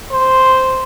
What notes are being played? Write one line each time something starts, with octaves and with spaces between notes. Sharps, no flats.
C5